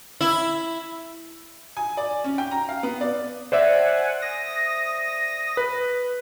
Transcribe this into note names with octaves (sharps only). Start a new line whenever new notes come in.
E4
G#5
D5
C#4
G5
A#5
F5
B3
D5
C5 D5 E5 F#5 G#5
D#6 A#6
B4